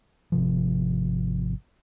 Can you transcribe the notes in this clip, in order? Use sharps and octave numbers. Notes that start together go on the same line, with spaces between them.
G#1 C3 F3